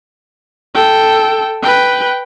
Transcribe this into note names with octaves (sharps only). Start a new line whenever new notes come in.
A4 G5
B4 G5